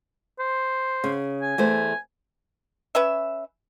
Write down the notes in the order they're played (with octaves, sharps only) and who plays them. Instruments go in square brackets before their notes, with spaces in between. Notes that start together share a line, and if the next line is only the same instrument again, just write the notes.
[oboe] C5
[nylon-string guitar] C#3
[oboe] G#5
[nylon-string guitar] E2 A3 C5
[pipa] C#4 B4 E5